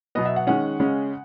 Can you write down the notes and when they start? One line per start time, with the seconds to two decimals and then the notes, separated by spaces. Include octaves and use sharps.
0.15 B2 F#3 B3 D#5
0.25 E5
0.36 F#5
0.47 D#3 G#3 C#4 F#5
0.80 C#3 G#3 C#4